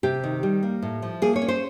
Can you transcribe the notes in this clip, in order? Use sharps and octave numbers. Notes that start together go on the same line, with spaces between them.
C3 G4
D#3
G3
A#3
A2
F3
A#3 G#4
C#5
C#4
C5